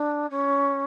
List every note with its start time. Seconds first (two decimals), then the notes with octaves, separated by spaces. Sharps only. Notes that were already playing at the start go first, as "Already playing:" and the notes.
Already playing: D4
0.30 C#4